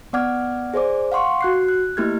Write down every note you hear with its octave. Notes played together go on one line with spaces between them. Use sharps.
B3 D5 F#5 D6 F6 G#6
G#4 C5 D5 D6
F5 F#5 C6 C#6
F#4 F#6 C7
F#6
A3 A#3 E4 G4 F6 G#6